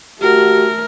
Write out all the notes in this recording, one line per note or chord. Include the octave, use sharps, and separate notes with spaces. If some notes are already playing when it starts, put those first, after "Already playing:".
A3 F#4 G4 A#4